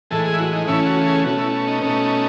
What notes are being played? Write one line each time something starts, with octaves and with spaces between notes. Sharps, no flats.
A2 E3 G#3 A4
G#4
E4
F#4
D#4
C#3 E3 A3 C#4 E4
F#4
G#4
B2 A3 C#4 F#4
E4
D#4
B2 A3 C#4